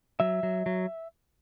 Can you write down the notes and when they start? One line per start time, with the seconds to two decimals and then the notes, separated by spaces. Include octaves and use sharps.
0.20 F#3 E5
0.43 F#3
0.66 F#3